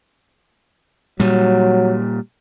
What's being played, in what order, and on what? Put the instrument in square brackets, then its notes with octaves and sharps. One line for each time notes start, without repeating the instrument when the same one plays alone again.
[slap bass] A#2 G3 [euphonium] F#3